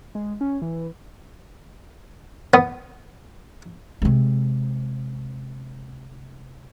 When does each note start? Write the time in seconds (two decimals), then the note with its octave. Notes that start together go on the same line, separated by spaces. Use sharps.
0.15 G#3
0.41 C#4
0.62 E3
2.54 B3
4.02 C3 G#3